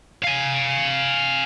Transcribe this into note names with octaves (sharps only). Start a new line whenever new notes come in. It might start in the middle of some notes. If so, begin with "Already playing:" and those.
F5 G#5